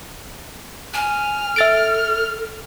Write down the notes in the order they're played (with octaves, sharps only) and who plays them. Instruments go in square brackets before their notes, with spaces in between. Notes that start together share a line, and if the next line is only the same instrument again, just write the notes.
[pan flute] G#5 [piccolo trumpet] F6
[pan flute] A4 [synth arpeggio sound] E5 A6 D7